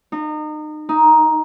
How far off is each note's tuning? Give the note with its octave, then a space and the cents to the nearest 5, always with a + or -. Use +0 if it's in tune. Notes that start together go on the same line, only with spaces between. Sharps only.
D#4 -30
D#4 +10